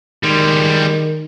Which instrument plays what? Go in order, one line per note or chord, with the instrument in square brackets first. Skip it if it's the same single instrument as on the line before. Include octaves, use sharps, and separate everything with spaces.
[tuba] D#3 [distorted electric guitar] G3 G#3